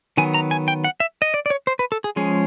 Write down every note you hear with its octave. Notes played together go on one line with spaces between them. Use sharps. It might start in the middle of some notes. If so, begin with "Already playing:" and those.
D#3 F#3 B3 G#5
A#5
G#5
G5
F#5
E5
D#5
D5
D5
C#5
C5
B4
A4
G#4
F3 G#3 C#4 G#4